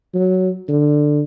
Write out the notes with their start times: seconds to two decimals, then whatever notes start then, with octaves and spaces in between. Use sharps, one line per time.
0.14 F#3
0.69 D3